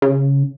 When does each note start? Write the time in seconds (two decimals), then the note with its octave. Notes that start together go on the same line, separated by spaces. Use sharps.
0.02 C#3